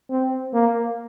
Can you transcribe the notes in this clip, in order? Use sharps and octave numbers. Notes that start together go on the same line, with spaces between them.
C4
A#3